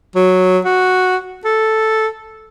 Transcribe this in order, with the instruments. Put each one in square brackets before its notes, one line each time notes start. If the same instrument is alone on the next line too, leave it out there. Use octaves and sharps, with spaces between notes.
[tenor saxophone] F#3
F#4
A4